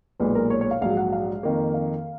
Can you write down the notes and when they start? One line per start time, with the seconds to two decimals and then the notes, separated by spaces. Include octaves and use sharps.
0.20 B1 A#2 G#3 B4
0.35 A#4
0.50 C#5
0.61 C#5
0.71 F5
0.81 A#1 G#2 F#3 F5
0.97 F#5
1.12 F5
1.43 F2 D#3 A#3
1.74 F5